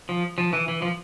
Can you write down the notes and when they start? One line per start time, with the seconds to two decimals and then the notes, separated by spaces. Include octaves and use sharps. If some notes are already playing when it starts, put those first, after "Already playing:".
0.09 F3
0.38 F3
0.53 E3
0.68 E3
0.82 F3